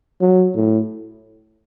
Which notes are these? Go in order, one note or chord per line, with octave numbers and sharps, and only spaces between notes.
F#3
A2